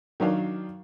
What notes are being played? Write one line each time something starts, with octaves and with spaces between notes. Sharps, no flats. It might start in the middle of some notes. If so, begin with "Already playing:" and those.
D#3 F#3 D4 F5